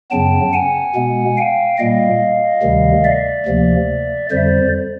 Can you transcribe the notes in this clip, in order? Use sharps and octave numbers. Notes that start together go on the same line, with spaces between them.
F#2 C#3 F#3 B3 G5 A5
F#5 G#5
B2 G#3 B3
F5 G5
A#2 G3 A#3 D#5 F5
D2 C3 D#3 G3
D5 E5
D2 C3 F3 A#3
F2 D3 G3 C5 D5